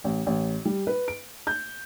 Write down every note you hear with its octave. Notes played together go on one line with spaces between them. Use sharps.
A1
A1
G3
B4
D7
G6